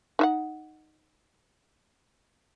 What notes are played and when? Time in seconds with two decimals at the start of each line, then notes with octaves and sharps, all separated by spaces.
0.19 D#4 E5 F#5